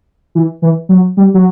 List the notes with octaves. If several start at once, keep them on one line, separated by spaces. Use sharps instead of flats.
E3
E3
F#3
G3
F#3